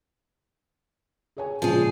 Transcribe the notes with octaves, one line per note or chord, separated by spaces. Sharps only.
G#4 C#5 G#5
A#2 C#3 F3 G#3 G#4